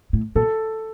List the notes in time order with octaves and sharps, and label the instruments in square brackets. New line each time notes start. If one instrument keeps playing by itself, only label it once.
[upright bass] A2
[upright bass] A#2 [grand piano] A4